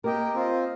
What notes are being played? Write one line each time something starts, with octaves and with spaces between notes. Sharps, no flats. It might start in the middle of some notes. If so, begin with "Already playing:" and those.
A#3 G4 A#4 D#5 G5
C4 F4 C5 D#5